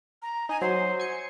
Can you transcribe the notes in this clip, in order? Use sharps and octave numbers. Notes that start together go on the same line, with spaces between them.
A#5
D#4 D#5 G#5
F#3 C5
G#5 C#7